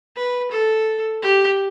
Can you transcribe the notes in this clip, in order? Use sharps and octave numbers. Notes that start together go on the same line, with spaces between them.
B4
A4
G4